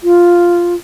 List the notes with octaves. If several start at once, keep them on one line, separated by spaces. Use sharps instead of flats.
F4